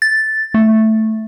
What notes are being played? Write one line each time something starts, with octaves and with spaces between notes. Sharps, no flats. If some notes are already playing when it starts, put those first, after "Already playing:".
A6
A3